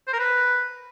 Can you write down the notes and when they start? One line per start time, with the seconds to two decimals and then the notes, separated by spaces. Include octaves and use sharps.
0.07 C5
0.13 A#4
0.19 B4